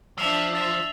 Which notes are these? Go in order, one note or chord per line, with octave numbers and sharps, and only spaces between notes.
F3 D4 E5 E6 C7 F7
E5 A6